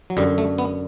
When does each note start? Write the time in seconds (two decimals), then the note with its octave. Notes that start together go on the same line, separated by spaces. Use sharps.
0.10 F#3
0.17 F#2 D3 G3
0.38 A3
0.58 B3